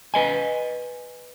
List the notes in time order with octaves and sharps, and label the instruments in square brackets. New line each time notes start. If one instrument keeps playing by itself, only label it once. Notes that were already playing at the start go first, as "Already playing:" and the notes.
[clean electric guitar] B4 D#5 G#5